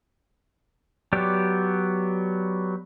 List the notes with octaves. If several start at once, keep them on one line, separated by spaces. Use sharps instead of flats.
F#3 B3 G4 D5